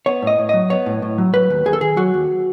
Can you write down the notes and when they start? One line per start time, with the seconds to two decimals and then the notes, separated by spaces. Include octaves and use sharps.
0.06 B3 C#5
0.23 A2 D#5
0.39 A2
0.49 F#3 D#5
0.70 B3 C#5
0.86 A2
1.02 A2
1.18 F#3
1.34 F#3 B4
1.50 D#2
1.66 D#2 G#4
1.73 A4
1.81 D#3 G#4
1.97 F#3 F#4
2.14 D#2